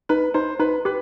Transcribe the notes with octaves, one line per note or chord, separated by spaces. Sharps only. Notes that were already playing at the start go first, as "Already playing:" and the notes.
D#4 B4
D#4 C5
D#4 B4
G4 B4